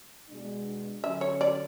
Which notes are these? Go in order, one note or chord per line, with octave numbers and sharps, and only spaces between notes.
B2 G#3 D4
D3 F#3 C#4 E5
C#5
D5